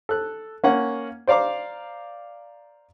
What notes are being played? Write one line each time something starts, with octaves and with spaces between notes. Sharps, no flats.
A4 F#6
A#3 C#4 F#5
C5 D5 F5 A#5 D6